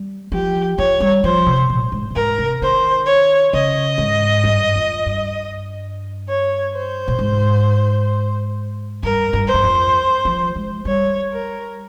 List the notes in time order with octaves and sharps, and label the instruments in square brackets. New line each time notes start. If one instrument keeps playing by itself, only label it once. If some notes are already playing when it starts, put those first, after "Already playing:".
Already playing: [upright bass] G3
[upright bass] F3 [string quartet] G4
[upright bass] F3 [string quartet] C#5
[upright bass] G3
[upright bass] F3 [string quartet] C5
[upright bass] C3
A#2
G#2
A#2
[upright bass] G#2 [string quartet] A#4
[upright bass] C3
[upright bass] D#3 [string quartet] C5
[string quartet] C#5
[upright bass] C#3 [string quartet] D#5
[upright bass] G#2
G2
F2
G2
[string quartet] C#5
C5
[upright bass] A#2
G#2
[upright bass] G2 [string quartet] A#4
[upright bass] G2
[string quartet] C5
[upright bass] G2
F2
F3
G#3
[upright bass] G3 [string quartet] C#5
[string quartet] A#4